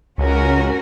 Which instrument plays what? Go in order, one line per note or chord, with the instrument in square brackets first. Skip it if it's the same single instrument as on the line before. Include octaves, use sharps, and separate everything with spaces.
[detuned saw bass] C#2 [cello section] C#4 F#4 A#4